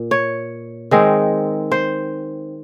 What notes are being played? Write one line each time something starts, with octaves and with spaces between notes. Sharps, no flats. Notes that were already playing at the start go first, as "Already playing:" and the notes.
Already playing: A#2
C#5
D#3 G#3 C4 D#4
C5